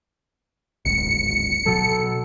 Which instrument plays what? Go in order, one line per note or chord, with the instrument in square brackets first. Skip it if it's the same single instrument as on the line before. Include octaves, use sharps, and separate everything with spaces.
[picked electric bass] D1 G#1 [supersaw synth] C#7
[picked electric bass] B2 F#3 [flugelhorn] A4